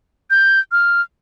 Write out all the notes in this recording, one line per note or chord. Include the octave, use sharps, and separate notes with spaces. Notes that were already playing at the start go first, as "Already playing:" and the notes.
G6
F6